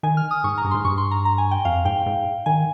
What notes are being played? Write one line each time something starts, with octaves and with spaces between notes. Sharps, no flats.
D#3 G#5
F6
D#6
G#2 C#6
A#5
G2
G#2 C6
G2 C#6
C6
A#5
A#5
G#5
G5
F2 F5
G#2 G5
G#2
D#3 G#5